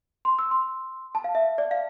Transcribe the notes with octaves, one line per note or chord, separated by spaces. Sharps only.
C6
E6
C6
A5
F5
E5
D5
F5